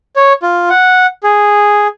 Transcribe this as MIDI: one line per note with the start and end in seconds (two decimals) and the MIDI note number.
0.16 0.33 73
0.43 0.69 65
0.70 1.06 78
1.23 1.87 68